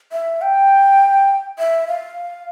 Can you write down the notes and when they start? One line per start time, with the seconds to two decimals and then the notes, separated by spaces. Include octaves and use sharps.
0.12 E5
0.42 G5
1.58 E5
1.88 F5